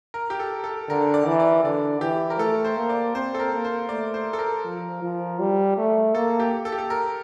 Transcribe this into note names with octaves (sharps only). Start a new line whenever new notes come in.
A#4
G4
A4
A4
D3 A#4
D5
E3
D5
D3 D5
E3 G4
A#4
A3 A4
C5
A#3
D5
C4 C5
A4
A#4
A#3
C5
A3 D5
C5
A4
A#4
F3
F3
G3
A3
A#3 A4
G4
A4
G4
A4
A#4